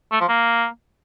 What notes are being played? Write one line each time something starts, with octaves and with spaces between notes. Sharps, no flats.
A3
F3
A#3